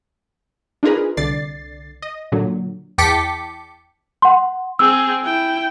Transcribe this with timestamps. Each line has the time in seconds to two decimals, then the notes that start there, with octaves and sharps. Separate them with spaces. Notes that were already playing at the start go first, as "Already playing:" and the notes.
0.83 D4 D#4 F4 G#4 A#4 B4
1.17 C2 D3 D5 A6 C7
2.02 D#5
2.32 A#2 D3 F#3
2.98 E2 G5 A5 D6 B6 C#7
4.22 F#5 C6
4.79 C4 G#4 E6
5.23 E4 G5